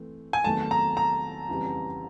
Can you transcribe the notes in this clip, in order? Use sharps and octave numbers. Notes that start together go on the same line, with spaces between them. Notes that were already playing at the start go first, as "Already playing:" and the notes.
Already playing: E3 A3 C4
G#5
E2 C3 D#3 F#3 A3 A5
A#5
A#5
F2 C#3 E3 G3